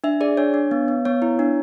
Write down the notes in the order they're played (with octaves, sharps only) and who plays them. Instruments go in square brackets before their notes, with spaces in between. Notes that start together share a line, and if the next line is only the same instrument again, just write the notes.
[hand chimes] D4 E5
G#4 D5
D4 C#5
D4
B3
B3
B3 C#5
E4
D4